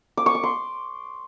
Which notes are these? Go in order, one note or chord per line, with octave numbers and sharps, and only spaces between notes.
D6
C#6
D6
C6